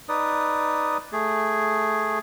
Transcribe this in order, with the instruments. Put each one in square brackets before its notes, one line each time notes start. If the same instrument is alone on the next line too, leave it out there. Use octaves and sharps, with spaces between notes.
[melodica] D#4 B4 D5 D#6
A3 G#4